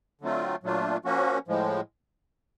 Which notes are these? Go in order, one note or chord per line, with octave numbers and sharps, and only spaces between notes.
D3 F#3 A3 C4 F4
A#2 F#3 A3 D4 F4
F3 A#3 C#4 F#4
A2 F3 G#3